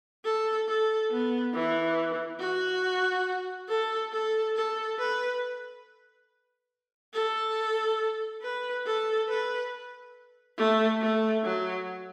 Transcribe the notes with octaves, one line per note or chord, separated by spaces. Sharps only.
A4
A4
B3
E3
F#4
A4
A4
A4
B4
A4
B4
A4
B4
A3
A3
F#3